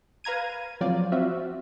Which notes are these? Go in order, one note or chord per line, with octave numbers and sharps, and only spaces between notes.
B4 F5 A#5 G#6 D#7
F3 F#3 C4 F4 D5
C4 F4 F#4 E5